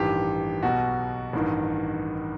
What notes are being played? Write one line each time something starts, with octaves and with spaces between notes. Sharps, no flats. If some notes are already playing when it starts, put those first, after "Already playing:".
Already playing: A1 G2 D#3 G4
B1 B2 F#4
A1 G2 D#3